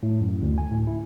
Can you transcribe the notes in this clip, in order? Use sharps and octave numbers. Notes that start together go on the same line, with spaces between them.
A2
F#2
D2
G#5
A2
E4